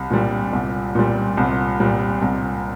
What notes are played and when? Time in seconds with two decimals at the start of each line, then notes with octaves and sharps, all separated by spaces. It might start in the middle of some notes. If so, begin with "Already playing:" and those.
Already playing: C2
0.10 A#2 G3
0.53 C2
0.95 A#2 G3
1.37 C2
1.80 A#2 G3
2.22 C2